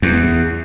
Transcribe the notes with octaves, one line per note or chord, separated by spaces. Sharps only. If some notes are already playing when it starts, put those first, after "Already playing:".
E2